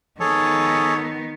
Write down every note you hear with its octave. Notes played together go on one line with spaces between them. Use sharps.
D#3 B3 G#4 A4 C#5